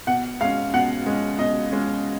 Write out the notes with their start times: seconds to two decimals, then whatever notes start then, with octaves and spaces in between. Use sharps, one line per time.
0.07 B2 F#5
0.40 G#3 C#4 F5
0.73 B2 F#5
1.06 G#3 C#4
1.39 B2 D#5
1.71 G#3 C#4